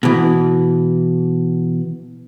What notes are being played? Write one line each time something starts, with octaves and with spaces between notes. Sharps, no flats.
B2 E3